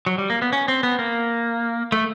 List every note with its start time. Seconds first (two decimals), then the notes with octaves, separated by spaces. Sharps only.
0.06 F#3
0.18 G3
0.30 A#3
0.42 B3
0.53 C#4
0.68 C4
0.83 B3
0.99 A#3
1.92 A3